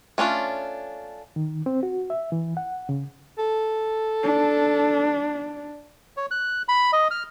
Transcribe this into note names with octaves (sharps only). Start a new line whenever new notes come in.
A3 C#4 D4 F4
D#3
C4
F#4
E5
E3
F#5
C#3
A4
D4
C#5
F#6
B5
D#5
F6